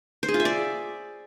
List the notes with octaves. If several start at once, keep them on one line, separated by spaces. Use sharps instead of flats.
C5
G#4
F4
E5
D5